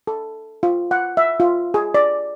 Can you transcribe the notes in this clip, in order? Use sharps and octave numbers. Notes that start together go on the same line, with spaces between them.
A4
F4
F#5
E5
F4
G#4
D5